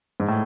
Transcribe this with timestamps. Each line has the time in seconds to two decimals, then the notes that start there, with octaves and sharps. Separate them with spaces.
0.20 G#2
0.28 A2